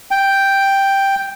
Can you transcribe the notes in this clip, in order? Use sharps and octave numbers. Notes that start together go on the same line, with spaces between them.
G5